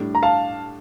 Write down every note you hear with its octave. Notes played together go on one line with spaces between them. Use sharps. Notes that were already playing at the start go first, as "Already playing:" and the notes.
Already playing: A2 G3 D4
A#5
F5 A5